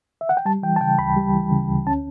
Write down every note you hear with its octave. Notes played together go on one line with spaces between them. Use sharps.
E5
F#5
G5
G3 A5
E3 G5
A5
C#3 G5
D2 B5
G3
E3
C#3
D2
C#4 A5